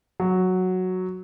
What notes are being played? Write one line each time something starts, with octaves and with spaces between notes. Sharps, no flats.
F#3